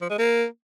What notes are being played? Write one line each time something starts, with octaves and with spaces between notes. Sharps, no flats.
F3
G#3
A#3